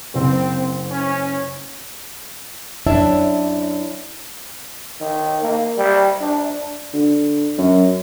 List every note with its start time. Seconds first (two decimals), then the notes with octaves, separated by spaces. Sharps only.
0.14 F#1 C4
0.90 C#4
2.86 F#2 D4 E4 C#5 E5 A5
5.01 D#3
5.43 A#3
5.77 G3
6.21 D4
6.94 D3
7.58 F#2